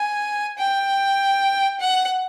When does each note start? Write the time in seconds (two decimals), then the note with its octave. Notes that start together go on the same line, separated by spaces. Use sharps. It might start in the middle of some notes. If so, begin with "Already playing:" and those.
Already playing: G#5
0.58 G5
1.79 F#5